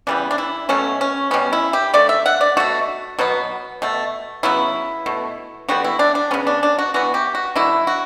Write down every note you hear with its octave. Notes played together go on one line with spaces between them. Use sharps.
C#3 E3 G3 B3 D4
D4
E4
B2 F#3 A3 C#4
C#4
B2 G3 B3 C#4
E4
G4
D3 A3 D5
E5
F#5
D5
B2 A3 F#4
B2 F#3 B3
B2 A3
C#3 F#3 B3 E4
B2 A3
D3 G3 B3 F#4
E4
D4
D4
C#3 F#3 B3 C#4
D4
D4
F#4
E3 B3 F#4
G4
F#4
D3 F#3 A3 E4
F#4